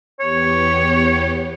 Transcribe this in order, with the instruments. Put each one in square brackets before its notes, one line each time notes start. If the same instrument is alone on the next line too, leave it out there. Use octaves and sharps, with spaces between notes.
[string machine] E2 B3 G4 [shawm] C#5